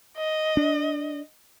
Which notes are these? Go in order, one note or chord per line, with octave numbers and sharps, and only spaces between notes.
D#5
D4